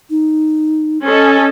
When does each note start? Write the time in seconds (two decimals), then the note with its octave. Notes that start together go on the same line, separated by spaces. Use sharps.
0.10 D#4
1.05 C#4 A4 D#5